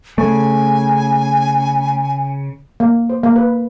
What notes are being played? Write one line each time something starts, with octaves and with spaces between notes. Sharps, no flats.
C#3 A3 G#5
A#3
C5
A#3
B4